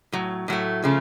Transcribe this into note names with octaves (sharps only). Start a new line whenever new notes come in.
A2 F#3
A2 F#3 A3
C#3 F3 A3